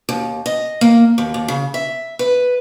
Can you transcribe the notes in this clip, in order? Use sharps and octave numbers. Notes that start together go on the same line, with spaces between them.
D#2
D#5
A#3
D#2
D#2
C#3
E5
B4